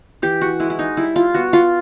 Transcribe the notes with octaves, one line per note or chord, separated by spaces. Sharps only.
E3 G4
F#4
G#3 E4
E4
D#4
G3 E4
F4
B3 F#4
F4